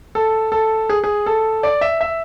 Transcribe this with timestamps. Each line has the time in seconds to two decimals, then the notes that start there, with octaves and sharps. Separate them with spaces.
0.15 A4
0.52 A4
0.90 G#4
1.04 G#4
1.26 A4
1.63 D5
1.81 E5
2.01 E5